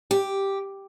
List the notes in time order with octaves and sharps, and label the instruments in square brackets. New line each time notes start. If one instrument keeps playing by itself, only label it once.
[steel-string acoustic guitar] G4